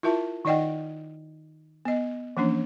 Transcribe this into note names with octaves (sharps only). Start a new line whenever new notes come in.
E4 F4 A#4 E5 A5
D#3 D#4 D5 D#5 F#5 G5
B3 D#5
E3 F3 A#3 C#4 D4